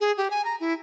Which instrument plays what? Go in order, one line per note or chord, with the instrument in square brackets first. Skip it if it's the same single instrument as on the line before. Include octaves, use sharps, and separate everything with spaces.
[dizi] G#4
G4
G#5
A#5
E4